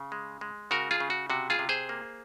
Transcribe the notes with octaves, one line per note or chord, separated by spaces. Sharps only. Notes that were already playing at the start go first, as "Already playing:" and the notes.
Already playing: C#3
G#3
G#3
C#3 F#4 A#4
F4 G#4
C#3
F#4
C3 F#4
F4 G#4
C3
G#4 C5
A#3